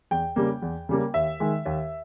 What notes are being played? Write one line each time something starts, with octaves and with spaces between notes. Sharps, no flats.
E2 G5
C#3 G3 A#3
E2
C#3 G3 A#3
D#2 E5
D#3 G#3
D#2